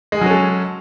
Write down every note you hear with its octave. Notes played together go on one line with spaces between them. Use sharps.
F#3 G#3 C#4 G#4 A4